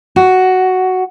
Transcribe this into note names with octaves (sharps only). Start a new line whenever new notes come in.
F#4